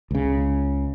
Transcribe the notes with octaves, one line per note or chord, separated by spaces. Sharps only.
C#2 C#3